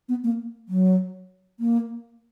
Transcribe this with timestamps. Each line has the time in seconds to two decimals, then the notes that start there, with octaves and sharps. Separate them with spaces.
0.09 B3
0.24 A#3
0.69 F#3
1.60 A#3